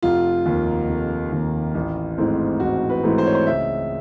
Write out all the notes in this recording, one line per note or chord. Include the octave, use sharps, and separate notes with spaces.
F1 F4
D#2 D#3
F1
D#2 D#3
A1
G#2 E3 A3 C4
A1 F#4
B4
G#2 E3 A3 C4
C5
C#5
C5
C#2 E5